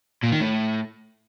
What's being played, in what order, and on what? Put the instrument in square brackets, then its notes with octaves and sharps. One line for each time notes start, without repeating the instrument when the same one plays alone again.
[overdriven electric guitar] A#2
D#3
A2